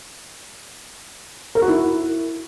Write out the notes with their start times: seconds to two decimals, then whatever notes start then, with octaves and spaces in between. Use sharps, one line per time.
1.55 A#4
1.62 F#4
1.68 E4